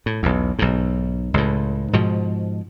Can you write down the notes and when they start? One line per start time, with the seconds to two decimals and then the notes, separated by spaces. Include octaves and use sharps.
0.06 A2
0.23 B1 E2
0.59 B1 G#2
1.34 C#2 A2
1.93 G#2 B2 F3